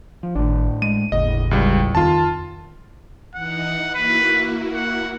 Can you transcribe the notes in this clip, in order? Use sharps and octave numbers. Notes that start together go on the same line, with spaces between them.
F3
G#1 A2 D4
G#3 D#7
G1 D#2 A2 C#3 D#5
C#2 G3
F2 D#3 F4 A5
E3 D#4 F#5
A#3 E4 F#4 B4
F#5